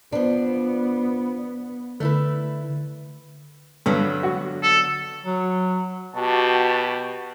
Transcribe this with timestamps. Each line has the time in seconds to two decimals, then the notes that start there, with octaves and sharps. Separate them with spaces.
0.12 F3 B3 D4
2.00 D3 A3 E4 B4
3.86 G2 D3 F#3 B3
4.23 F#4
4.63 A4
5.24 F#3
6.15 B2 F#4 G4 A5